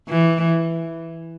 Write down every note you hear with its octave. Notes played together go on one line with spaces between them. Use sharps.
E3